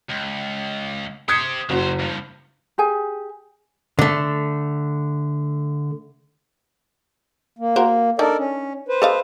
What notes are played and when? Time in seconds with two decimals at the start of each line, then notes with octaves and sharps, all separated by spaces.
0.09 C#2
1.28 G4 C5 D#6 G#6 C#7
1.70 F#1 A2 F#4 C5
2.00 G2 F3
2.78 G4 G#4 G#5
3.99 D3 A3
7.59 A#3
7.76 F#4 A#4 C5
8.19 D4 D#4 A4 A#4 D5
8.38 C#4
8.89 B4 C5
9.02 A4 D#5 F5